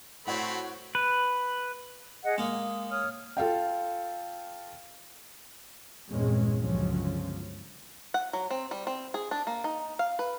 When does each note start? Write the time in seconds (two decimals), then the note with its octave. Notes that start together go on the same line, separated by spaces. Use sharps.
0.26 A2 A3 C4 F#4 C#5 B5
0.95 B4
2.25 G#4 D#5 F#5
2.38 G#3 A#3 D#6
2.90 C#5 D#6 F6
3.37 F4 A4 F5 G5
6.09 E2 G2 A#2 G#3 C4 C#4
6.60 G1 C#2 D3 F3 F#3 C#4
8.14 F#5
8.33 F#3
8.50 C4
8.71 G3
8.87 C4
9.14 G#4
9.31 D4
9.47 A#3
9.64 D#4
9.99 F5
10.19 B4